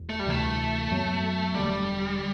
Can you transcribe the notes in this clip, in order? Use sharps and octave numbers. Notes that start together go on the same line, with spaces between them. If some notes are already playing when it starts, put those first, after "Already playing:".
Already playing: E1 E2
A3
G3
D2 C3 E3 A3
F#2 F#3 B3
E1 E2 D3 G3